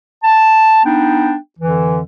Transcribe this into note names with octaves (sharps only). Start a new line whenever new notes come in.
A5
B3 D4 D#4 G5
F2 D3 E3